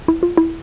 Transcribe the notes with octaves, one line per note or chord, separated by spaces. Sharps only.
E4
F4
E4